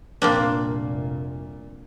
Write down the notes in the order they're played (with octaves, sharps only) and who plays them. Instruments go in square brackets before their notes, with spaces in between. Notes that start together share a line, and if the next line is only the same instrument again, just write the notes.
[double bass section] F1 C2 A#2 [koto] A#3 C4 D4